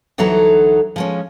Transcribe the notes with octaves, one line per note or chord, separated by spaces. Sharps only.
D2 E3 F#3 D#4 A4 A#5
F3 G#3 C#4